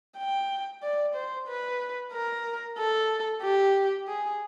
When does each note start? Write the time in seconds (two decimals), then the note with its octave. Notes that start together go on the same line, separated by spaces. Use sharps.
0.18 G5
0.83 D5
1.15 C5
1.48 B4
2.13 A#4
2.78 A4
3.42 G4
4.08 G#4